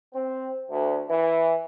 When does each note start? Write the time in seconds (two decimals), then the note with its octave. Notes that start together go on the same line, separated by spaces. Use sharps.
0.14 C4
0.70 D2
1.09 E3